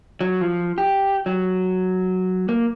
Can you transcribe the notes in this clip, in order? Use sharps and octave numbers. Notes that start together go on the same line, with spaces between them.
F#3
F3
G4
F#3
A#3